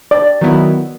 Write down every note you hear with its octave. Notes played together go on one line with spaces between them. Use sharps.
D5
D#3 F#3 B3 E4